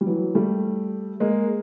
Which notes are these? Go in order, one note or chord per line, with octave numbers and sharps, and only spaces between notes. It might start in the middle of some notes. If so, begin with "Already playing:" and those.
G3
E3 F#3
G3 A3
G#3 A#3